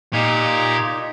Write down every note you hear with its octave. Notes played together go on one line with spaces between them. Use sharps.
A#2 D#4 G4 A#5 G#6